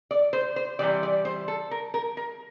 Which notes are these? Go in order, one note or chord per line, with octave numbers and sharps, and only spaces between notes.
D5
C5
C5
C3 E3 G3 D5
D5
C5
A4
A#4
A#4
A#4